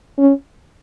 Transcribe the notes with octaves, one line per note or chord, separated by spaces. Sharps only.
C#4